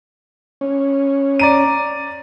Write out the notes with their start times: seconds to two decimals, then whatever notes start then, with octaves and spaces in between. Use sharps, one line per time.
0.61 C#4
1.39 D5 A#5 D#7